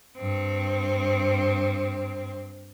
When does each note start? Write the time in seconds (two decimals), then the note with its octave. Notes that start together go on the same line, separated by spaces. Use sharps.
0.18 G2 C4